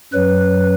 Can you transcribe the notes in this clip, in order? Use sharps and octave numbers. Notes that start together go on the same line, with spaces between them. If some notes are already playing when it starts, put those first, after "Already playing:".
F#2 F#3 B4